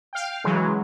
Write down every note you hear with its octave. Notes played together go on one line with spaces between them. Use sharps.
F5 G5
C#3 E3 F#3 G#3